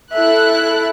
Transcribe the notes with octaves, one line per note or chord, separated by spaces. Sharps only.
E4 A4 E5 F#6